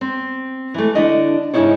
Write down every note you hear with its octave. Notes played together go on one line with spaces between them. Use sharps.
C4
E3 A3
D3 D4 E4 D#5
G#2 C#3 F3 D#4 E4 C#5